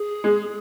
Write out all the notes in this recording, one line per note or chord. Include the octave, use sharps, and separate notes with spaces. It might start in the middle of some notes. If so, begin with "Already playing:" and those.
Already playing: G#4
G#3